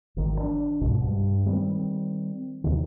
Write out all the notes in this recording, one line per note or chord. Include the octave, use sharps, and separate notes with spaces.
G#1 D#3
D4
C#2 G#2 B2
G2
D#3 G3 C4
D#2 C3 D#3